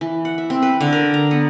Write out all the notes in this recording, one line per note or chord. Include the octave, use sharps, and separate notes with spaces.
E3
F#5
E5
C4
B4
D3
A#4
A#5
B3